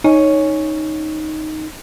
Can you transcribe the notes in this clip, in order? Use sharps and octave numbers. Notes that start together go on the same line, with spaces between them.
C#4 D#4